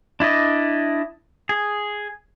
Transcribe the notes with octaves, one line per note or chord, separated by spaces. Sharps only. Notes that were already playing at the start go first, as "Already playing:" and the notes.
D4 E4 D5 D#5
G#4